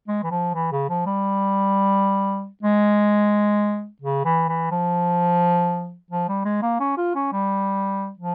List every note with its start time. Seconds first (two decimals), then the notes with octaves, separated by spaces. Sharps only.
0.08 G#3
0.24 E3
0.31 F3
0.55 E3
0.72 C#3
0.89 F3
1.07 G3
2.63 G#3
4.02 C#3
4.25 E3
4.49 E3
4.72 F3
6.11 F3
6.29 G3
6.45 G#3
6.63 A#3
6.80 C#4
6.98 F4
7.15 C#4
7.33 G3
8.19 F3